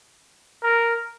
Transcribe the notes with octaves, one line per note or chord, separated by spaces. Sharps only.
A#4